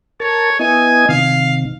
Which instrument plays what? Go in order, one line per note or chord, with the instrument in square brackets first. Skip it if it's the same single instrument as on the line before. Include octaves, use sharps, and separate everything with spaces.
[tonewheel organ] A#4 A5 [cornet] C#5
[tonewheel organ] B3 E4 D#5 [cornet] G#5
[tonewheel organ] C3 D#3 [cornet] F5